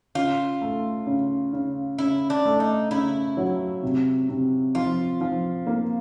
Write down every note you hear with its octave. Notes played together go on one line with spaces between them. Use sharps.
C#3 F4
A3
C#3
C#3
C#3 E4
D4
A3
D#4
C#3 E4
F#3
C3
C3
F3 F4
F3
A#3